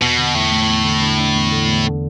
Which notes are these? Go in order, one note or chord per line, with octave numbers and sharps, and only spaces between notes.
E2 B2
D3
E2 A2
A3
E2
D3
D3
D4
E2
D3
E2
D3